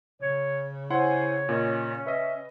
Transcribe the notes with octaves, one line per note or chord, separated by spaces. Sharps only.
C#3 C#5
E4 C5 C#5 F#5 G#5 C6
A#2 C#4 F4 D#5
B4 D#5 E5